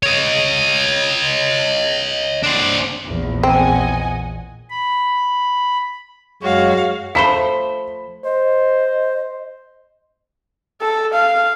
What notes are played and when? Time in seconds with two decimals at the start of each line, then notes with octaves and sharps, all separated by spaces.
0.03 C#5 D#5
2.43 D4 C5
3.05 A#1 E2
3.43 C4 D#5 F#5 G#5
4.70 B5
6.42 F#2 G#3 F#4 C#5 F5
7.15 F3 A3 C5 B5 B6
8.25 C5 D#5
10.82 A4
11.14 F5